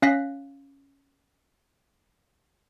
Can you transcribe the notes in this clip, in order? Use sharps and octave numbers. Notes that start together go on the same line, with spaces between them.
C#4 F5 F#6 A#6 B6